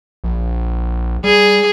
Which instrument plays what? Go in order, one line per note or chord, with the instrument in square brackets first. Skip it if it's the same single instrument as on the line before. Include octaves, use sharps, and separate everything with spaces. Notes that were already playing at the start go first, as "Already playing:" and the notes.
[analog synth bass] A#1
[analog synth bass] G3 [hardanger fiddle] G#4